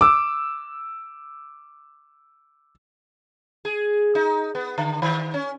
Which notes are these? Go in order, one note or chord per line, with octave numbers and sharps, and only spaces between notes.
D6 E6
G#4
D#4
B3
D3
D#3
C#4